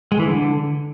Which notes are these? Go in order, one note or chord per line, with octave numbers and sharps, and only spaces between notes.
G#3
E3
D3